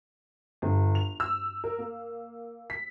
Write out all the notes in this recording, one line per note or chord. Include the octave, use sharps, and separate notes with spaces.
G1
F7
E6
A#4
A#3
B6